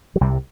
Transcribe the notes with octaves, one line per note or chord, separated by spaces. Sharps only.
F#3
C2 C3 G3